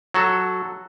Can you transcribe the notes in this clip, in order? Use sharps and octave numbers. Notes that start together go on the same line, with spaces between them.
F#3 F#4 A4